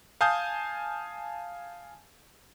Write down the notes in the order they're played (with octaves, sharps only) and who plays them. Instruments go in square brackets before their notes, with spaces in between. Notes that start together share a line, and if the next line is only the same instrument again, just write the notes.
[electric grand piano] F5 G#5 A5 D#6 G6